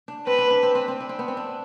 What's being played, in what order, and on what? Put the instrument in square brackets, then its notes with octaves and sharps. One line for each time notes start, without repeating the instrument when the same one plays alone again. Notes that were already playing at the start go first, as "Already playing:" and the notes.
[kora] D4
[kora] C4 [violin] B4
[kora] D4
D4
C4
C4
C4
D4
C4
B3
C4
D4